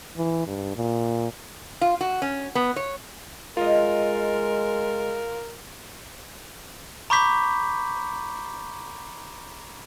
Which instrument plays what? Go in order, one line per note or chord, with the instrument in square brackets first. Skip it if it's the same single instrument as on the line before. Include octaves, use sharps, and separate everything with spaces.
[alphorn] E3
G2
A#2
[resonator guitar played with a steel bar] F4
F#4
C#4
B3
C#5
[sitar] F#3 D#5 [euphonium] G#3 [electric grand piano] F4 [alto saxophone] A#4
[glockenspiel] A#5 B5 C#6 D6 G6 B6